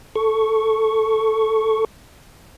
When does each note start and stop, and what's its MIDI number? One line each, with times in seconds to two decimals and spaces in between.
0.16 1.85 69
0.16 1.85 85